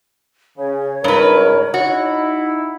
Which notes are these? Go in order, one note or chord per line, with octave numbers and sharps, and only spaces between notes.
C#3 C#5
C#2 G2 D#4 A#4 B4
D#4 E4 F#4